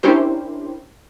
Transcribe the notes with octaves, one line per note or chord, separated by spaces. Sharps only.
C#4 D4 E4 G4 A#4 C5